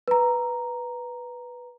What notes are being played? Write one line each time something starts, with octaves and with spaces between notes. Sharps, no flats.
B4 A#5